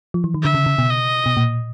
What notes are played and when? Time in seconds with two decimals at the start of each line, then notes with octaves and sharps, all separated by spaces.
0.14 F3
0.24 E3
0.34 D#3
0.43 D3 E5
0.55 C#3
0.66 C#3
0.78 B2
0.90 D#5
1.26 B2
1.37 A#2